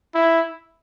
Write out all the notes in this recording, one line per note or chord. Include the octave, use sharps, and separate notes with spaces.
E4